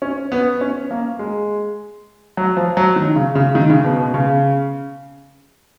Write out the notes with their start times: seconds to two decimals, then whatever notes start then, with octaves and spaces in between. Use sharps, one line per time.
0.02 C#4
0.32 B3
0.61 C#4
0.91 A#3
1.19 G#3
2.37 F#3
2.57 F3
2.77 F#3
2.96 D#3
3.16 C#3
3.35 C#3
3.55 D#3
3.70 C#3
3.85 B2
3.99 B2
4.14 C#3